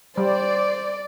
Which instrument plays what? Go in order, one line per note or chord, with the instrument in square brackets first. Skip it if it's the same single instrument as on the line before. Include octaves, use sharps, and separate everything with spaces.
[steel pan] G3 [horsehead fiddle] C5 [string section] D5